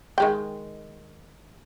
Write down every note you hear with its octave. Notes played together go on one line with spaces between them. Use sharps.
D#3 G#3 G5